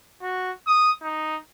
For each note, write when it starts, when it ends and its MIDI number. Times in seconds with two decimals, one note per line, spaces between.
0.22 0.52 66
0.67 0.91 87
1.02 1.38 63